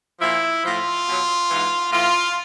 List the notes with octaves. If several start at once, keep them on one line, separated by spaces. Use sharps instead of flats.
A#2 F3 E4
A2 F3 F4
B2 F#3
G#2 E3
A2 E3 F4